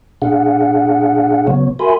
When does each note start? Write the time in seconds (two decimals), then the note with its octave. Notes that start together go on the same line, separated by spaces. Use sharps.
0.22 A#2 D4 G#4 F5 F#5
1.47 C#3 F#3 B3 C#5
1.79 F#4 A#4 E5 G#5 B5 C6